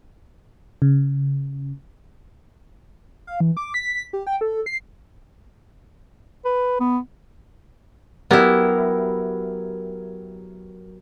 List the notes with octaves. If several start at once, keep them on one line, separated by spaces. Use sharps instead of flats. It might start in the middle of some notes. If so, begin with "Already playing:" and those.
C#3
F5
E3
D6
B6
G4
G5
A4
C7
B4
B3
F#3 B3 E4 G4 A#4